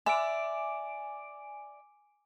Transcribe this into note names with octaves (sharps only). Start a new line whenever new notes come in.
D5 E5 G#5 D6 D7